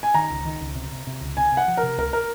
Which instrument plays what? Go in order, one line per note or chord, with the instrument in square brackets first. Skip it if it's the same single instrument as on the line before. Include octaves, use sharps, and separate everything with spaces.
[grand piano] G#5
[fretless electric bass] D#3 [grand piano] A#5
[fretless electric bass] C#2
D#3
C#2
C3
C3
C3
C#2
[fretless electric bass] C3 [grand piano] G#5
[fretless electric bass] C3
[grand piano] F#5
[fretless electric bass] F3
[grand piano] A#4
[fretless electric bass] C3
[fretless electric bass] C#2 [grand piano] A#4
[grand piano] A#4